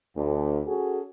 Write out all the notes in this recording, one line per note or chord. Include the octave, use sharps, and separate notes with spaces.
D2
C#4 F#4 G#4 A4